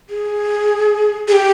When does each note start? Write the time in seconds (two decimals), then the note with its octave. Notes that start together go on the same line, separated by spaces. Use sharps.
0.10 G#4
1.28 G#4
1.32 G4